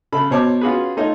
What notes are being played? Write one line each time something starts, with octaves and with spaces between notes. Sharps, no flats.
C#3 A4 B5
B2 C5 C#5 A5 D6
C#4 F4 F#4 G#4 B4
A3 D#4 F4 C#5 D#5